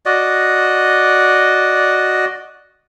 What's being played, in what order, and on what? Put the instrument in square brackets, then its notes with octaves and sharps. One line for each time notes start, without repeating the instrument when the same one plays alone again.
[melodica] F#4 D5 D#5